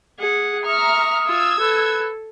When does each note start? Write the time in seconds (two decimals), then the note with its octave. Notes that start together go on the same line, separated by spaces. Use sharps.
0.19 G#4 F#5
0.66 E5 A#5 C#6 D#6 F6
1.27 F4 E6 G#6
1.60 A4 B4